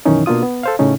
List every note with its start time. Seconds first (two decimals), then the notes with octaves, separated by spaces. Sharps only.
0.05 F#2 B2 D#3 E3 C#4 D#4
0.26 B2 A#3 D4 F4 D#6
0.43 B3
0.63 A4 C5 F5
0.79 A2 C#3 A3 C#4 D#4